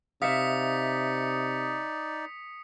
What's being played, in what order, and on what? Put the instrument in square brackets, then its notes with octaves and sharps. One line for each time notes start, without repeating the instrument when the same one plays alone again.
[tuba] C3 [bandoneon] D#4 D5 [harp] E5 F5 [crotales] D#6 B6 C#7